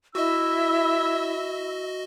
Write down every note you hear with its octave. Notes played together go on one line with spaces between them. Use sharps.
E4 F#4 D#5 E5 E6